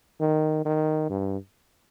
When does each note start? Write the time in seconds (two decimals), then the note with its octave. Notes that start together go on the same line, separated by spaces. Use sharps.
0.20 D#3
0.65 D#3
1.10 G2